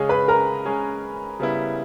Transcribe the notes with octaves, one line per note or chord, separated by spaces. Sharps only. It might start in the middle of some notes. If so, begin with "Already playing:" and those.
Already playing: C#3 G#3 C#4 G#4
B4 B5
A#4 A#5
G#3 C#4 G#4
C#3 G3 B3 E4